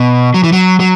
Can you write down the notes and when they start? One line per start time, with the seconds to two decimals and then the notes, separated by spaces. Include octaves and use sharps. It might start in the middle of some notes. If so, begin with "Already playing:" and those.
Already playing: B2
0.34 F#3
0.44 E3
0.53 F#3
0.80 F#3